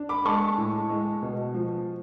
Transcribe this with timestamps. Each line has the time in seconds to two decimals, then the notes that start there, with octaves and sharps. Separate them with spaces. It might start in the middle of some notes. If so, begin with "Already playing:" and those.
Already playing: D4
0.09 B5 D6
0.25 G#3 A5 C#6
0.58 A2
0.90 G#3
1.22 B2
1.54 F3